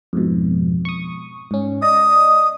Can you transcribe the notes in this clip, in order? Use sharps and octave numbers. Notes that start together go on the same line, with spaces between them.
F2 G#2 B2
C#6 D#6
G#2 C#4
D5 D#5 D#6